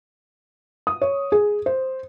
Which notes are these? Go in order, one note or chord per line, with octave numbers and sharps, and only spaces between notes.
D#6
C#5
G#4
C5